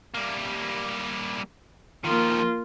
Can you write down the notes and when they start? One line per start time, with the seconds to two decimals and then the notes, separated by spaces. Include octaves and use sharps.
0.15 G3 A#3
2.05 D#3 F3 A#3 F4